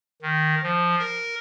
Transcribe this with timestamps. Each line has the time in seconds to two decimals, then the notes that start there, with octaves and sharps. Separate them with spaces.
0.22 D#3
0.63 F3
0.99 A#4